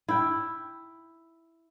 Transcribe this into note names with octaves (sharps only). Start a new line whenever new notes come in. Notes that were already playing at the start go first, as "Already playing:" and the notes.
E4 G5